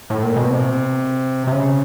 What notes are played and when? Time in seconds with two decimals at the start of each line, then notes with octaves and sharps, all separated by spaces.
0.10 A2
0.23 A#2
0.36 B2
0.50 C3
1.47 C3
1.52 C#3